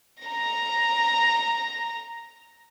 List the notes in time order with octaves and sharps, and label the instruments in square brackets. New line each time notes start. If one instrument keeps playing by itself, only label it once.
[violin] A#5 A#6